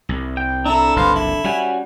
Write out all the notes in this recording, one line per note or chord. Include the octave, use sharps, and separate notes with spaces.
C2
G5
D4 E4 A4 A#5 E6
F#1 C2 B4 C5 F5
E4
G3 C#4 F#4 G#5